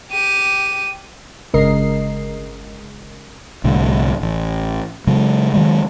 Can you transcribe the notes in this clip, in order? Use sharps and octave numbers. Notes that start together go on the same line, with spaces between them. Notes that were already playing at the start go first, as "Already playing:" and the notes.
G4 D#7
G1 C#3 G#3 A#4 D#5 C7
C2 A2 D3
A1
C#3 F#3 G#3
D#3 F#3 G#3